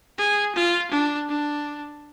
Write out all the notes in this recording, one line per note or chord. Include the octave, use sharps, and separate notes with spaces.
G#4
F4
D4
D4